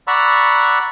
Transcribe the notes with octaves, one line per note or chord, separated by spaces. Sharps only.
D5 F#5 A#5 B5 C#6 E6